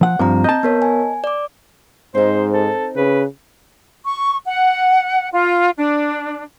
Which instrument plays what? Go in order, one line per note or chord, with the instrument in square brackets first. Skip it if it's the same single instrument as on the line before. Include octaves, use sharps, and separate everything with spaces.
[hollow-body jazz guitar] F3 F#5
[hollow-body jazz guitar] G2 F3 [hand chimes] C4 A#5
[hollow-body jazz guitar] D#5 A5 [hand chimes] G6
[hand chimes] B3 A#4 C#5
G#5
D5 D6
[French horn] G#2 [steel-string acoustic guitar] C4 D#4 [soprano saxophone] C5
[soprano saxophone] A4
[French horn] C#3 [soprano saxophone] B4
[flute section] C#6
F#5
F4
D4